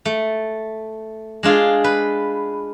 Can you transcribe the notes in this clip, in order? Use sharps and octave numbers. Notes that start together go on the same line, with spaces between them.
A3
G#3 D4 F4 G#4
B4